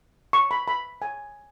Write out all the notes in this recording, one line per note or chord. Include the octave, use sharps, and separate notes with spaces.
C#6
B5
B5
G#5